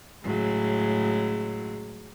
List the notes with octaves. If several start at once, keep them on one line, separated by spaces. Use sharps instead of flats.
A2 C#3 F#3 G#3